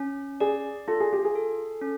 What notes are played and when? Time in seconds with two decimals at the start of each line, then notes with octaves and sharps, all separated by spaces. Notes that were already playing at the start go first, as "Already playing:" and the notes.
Already playing: C#4
0.40 G#4 D5
0.88 F4 A4
1.00 G#4
1.13 G4
1.25 G#4
1.35 A4
1.81 C#4